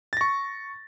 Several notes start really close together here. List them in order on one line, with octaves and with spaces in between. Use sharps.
A6 A#6 C#6